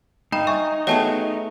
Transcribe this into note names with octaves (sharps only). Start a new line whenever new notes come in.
G2 D#4 G5 B5
E5 G#5 C#6
A3 B3 F#4 G#4 C#5 E5 G5 A5